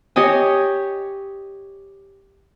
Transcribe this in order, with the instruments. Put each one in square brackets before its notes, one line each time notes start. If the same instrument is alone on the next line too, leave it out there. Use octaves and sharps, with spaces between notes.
[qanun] G4 C#5 D#5 G#5